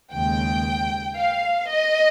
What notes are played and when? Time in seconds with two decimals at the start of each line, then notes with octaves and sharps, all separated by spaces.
0.13 D#2 C#3 G#3 G5
1.16 F5
1.69 D#5